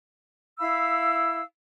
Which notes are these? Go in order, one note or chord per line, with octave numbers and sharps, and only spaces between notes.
E4 F5 B5 E6